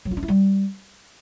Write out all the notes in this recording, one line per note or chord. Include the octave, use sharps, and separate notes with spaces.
F#3
F4
D4
E4
G3